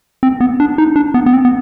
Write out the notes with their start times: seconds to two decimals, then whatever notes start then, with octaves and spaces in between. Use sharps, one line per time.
0.23 C4
0.40 B3
0.60 D4
0.78 D#4
0.96 D4
1.14 B3
1.26 B3
1.33 C4
1.45 B3